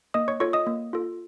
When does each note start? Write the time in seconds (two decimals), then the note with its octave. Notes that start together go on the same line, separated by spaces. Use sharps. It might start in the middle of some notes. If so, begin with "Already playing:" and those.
0.14 A#3 D#5 D#6
0.28 C#5 C#6
0.40 F4 A4 C#5 C#6
0.53 D#5 D#6
0.67 A#3
0.93 F4 A4